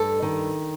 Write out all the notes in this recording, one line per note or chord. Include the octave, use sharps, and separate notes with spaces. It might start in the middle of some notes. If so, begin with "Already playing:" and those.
Already playing: G2 A4
D#3